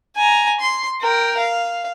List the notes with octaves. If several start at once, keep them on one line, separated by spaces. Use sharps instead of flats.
G#5 A#5
C6
A#4 G5
F5